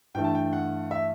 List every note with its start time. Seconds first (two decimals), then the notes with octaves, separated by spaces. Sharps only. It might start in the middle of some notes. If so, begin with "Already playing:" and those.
0.14 G2 E3 A3 G5
0.24 A5
0.35 G5
0.53 F#5
0.91 E5